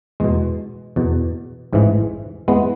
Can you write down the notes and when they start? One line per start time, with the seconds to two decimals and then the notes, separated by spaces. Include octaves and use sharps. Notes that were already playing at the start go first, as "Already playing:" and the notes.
0.20 E2 B2 G#3
0.96 E2 B2
1.73 A1 G#2 E3
2.48 E3 G#3 B3